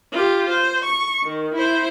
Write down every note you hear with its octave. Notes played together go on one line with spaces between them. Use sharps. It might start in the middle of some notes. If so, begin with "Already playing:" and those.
F4 G4
C5
C#6
D#3
E4 C5